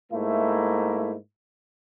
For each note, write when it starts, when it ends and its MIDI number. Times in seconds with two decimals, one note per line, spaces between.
0.11 1.14 44
0.11 1.14 57
0.11 1.14 58
0.11 1.14 64